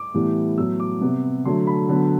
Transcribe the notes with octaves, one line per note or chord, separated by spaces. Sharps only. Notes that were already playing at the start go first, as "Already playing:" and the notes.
Already playing: D6
A2 E3 G3 B3
A2 F#3 B3 E6
D6
C3 G3 B3
D3 F#3 A3 C6
B5
D3 F#3 B3